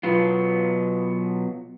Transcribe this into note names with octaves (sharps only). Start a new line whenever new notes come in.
B2 F#3 B3 F4